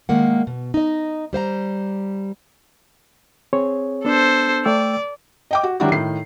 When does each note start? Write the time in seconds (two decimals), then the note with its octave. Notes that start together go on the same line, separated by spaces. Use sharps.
0.09 D#3 G#3 A#3 F#5
0.47 B2
0.74 D#4 D#5
1.33 G3 C5 F5 A#5
3.53 C4 G#4 C#5
4.05 B3 D4 A4 C5
4.65 A3 D5 G5 E6
5.51 D#5 G5 D6
5.63 F#4
5.80 D#3 F#3 G3 D4 E4 F#4
5.92 A2 D#3 C7